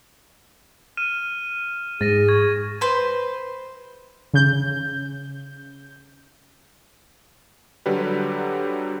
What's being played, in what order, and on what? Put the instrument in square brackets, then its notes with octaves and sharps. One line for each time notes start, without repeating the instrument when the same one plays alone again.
[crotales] F6 D#7 E7
[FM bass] G#2 [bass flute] G#4 [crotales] A6 A#6 D#7
[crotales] C#6 G#6
[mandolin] B4 C5
[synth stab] C#3 G6
[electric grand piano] D3 F#3 G3 G4 B4